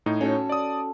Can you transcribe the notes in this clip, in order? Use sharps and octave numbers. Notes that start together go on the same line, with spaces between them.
A2 D#4
C#4 F#4 A4
D5 D#6